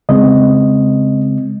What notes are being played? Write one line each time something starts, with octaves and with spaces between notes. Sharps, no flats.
C#3 G#3 C4 D#5